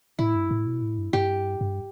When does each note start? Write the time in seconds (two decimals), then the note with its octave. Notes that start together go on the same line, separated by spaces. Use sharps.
0.19 A2 E4
0.35 G2
0.51 A2
0.66 B2
0.82 A2
0.98 G2
1.13 G2 G4
1.61 G2